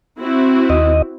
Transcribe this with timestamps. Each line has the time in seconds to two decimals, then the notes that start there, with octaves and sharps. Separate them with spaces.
0.18 C4 E4 F#4
0.70 D#2 D#5